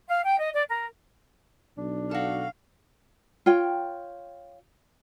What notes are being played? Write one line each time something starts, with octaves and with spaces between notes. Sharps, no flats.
F5
G5
D#5
D5
A#4
B1 D4
F#4 A4 F5
F4 C#5 G5